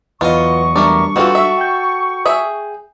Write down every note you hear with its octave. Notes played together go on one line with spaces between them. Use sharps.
E2 F#3 F4 B4 D#5 C#6
G3 A3 D4 A#4 D5
E3 C4 F4 F#4 A4
E5
G5 G6
G#4 E5